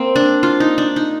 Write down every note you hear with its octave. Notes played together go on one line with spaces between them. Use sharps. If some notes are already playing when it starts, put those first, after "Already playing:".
Already playing: A#3 C4
D4
F4
D#4
D4
D#4